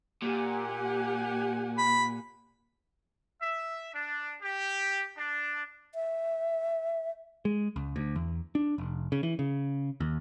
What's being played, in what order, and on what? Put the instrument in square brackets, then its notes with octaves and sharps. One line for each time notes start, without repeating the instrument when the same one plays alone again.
[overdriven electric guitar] A#2 [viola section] G4 F#5 G#5
[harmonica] B5
[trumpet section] E5
D4
G4
D4
[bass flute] E5
[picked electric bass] G#3
C#2
D2
E2
D4
F1
C#3
E3
C#3
D#2